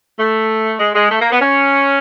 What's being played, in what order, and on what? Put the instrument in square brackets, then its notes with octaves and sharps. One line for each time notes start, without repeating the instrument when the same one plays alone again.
[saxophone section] A3
G#3
G#3
A3
A#3
B3
C#4